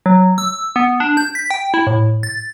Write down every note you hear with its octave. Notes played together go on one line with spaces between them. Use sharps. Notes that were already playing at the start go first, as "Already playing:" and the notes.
F#3
E6
B3
D4
G6
B6
G5
E4
A2
A6